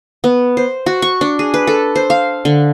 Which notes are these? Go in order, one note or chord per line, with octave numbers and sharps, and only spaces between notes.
B3
C5
F#4
C#6
D4
G#4
B4
A4
C5
F5
D3